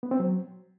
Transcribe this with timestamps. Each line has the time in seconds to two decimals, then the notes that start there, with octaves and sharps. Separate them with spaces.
0.03 B3
0.11 C4
0.20 F#3